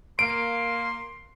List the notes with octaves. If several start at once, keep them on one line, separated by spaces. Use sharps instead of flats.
A#3 C6 D7